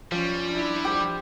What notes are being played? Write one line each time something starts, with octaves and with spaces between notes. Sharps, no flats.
F3 G3 C#4 F4
D4 E4
G4 C5